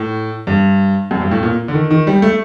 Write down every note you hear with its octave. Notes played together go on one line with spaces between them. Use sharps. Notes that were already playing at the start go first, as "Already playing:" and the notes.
Already playing: A2
G2
F#2
G2
A2
A#2
D3
D#3
D#3
G3
A3